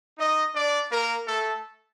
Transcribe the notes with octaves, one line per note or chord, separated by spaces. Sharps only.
D#4 D#5
D4 D5
A#3 A#4
A3 A4